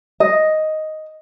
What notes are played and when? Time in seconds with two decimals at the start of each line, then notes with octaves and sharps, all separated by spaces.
0.20 D#5